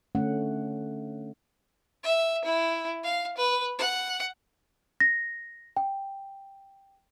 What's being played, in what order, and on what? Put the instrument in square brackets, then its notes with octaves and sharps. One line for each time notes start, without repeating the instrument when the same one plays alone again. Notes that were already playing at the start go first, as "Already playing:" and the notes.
[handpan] D3 A3 C#4 F#5
[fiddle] E5
E4
F5
B4
F#5
[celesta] A#6
G5